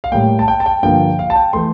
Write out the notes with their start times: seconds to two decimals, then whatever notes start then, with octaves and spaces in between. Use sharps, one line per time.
0.04 F5
0.12 A2 G3 A#3 G5
0.39 A5
0.48 G5
0.60 A5
0.66 G5
0.83 G2 D3 F3 A#3 G5
1.19 F5
1.30 A5
1.36 G5
1.53 E3 A3 C6